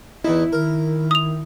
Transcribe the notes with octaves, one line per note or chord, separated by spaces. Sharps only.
E2 D#4 E4
D#3 A#4
D#6 F7